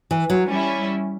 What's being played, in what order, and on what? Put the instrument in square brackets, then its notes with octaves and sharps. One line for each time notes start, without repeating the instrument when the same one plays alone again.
[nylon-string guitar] E3
F#3
[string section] G3 C#4 E4